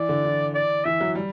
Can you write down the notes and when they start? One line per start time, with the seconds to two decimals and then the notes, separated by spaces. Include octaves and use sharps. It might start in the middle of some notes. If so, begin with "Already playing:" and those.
Already playing: E3 D5
0.09 D3
0.24 E3
0.54 D5
0.85 E3 E5
1.01 F#3
1.15 G3